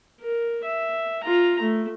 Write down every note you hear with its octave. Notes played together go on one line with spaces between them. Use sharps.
A#4
E5
F4 A#5
A3